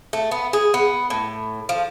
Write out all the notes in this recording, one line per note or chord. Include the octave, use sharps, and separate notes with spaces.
A3
B3
G#4
B3
A2
F3